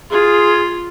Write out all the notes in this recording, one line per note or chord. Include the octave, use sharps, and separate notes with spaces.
F4 G#4